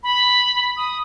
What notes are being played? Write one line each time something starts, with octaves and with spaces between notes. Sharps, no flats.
B5
D#6